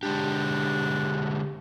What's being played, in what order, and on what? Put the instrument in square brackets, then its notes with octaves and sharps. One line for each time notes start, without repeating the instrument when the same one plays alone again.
[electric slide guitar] D3 G#3 G4 [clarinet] D4